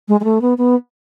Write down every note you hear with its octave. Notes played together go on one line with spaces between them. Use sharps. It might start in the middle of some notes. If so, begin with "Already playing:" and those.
G#3
G#3
A3
B3
B3